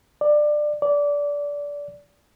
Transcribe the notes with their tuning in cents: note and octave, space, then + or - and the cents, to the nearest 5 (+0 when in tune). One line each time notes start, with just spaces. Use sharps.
D5 +20
D5 -20